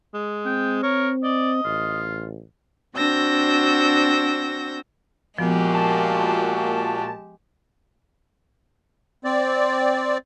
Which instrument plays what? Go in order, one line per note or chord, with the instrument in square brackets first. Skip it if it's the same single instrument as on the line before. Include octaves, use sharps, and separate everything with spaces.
[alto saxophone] G#3
[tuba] C4 [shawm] G5
[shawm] A#4 [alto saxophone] C#5
[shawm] D5 [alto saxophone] D#5
[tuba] A1 [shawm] F4
[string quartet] C4 D4 F#4 E6 G6 A#6
[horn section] A#2 F#4 [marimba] F3 B3 [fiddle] G#3 G4
[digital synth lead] A5
[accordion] C4 D5